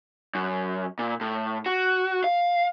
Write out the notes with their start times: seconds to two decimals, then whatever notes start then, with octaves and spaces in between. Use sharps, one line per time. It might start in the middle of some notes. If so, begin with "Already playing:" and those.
0.35 F#2
0.99 A#2
1.21 A2
1.66 F#4
2.24 F5